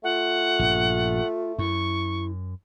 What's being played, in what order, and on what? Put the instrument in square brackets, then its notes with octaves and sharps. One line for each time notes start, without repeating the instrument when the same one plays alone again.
[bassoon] A3 [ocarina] F4 [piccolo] F#5
[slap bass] A#1 G2
[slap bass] F#2 [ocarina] E4 [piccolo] C#6